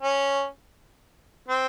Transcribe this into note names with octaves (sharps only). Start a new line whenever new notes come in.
C#4
C4